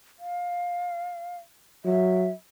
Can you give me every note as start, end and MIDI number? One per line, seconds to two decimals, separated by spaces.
0.19 1.37 77
1.85 2.30 54
1.85 2.30 76